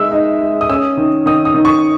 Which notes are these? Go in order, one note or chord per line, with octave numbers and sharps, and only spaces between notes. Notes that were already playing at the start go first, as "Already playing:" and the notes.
Already playing: G#3 D#4 E5 E6
D#4
G#3
D#6
C#4 E6
D#3
D#3 D#6
D#6
D#3
C#6